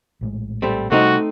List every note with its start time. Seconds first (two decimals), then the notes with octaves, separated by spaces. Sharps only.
0.21 A#1 A2 G#3
0.62 G3 A3 C4
0.92 C3 G3 A3 C4 D#4 F#4